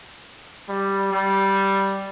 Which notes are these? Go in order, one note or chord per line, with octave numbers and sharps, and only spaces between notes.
G3
G3